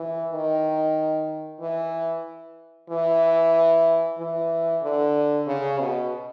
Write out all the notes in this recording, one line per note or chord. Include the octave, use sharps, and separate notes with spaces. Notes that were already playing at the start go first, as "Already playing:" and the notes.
Already playing: E3
D#3
E3
E3
E3
D3
C#3
B2